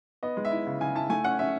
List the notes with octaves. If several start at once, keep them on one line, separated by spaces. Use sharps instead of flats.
B3 D#5
G#3
E5
E4
C#3
C#3 G#5
E4 A5
A3 G#5
C#4 F#5
C#4 E5